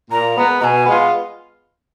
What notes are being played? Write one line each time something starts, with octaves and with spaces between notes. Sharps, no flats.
A#2 A#5
G#3 B3
B2 G#5 A#5
G#3 B3 F4